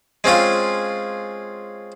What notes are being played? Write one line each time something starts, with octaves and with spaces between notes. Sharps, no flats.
G#3 C4 C#4 F4